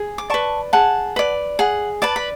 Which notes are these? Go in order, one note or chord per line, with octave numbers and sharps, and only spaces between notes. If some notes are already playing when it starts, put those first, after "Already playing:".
Already playing: G#4
D6
B4 D5 A5 C#6
G#4 F#5 A5
B4 D5
G#4 F#5
B4 D5 A5
B5